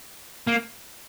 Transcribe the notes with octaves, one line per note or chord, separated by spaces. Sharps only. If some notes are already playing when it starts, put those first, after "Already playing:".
A#3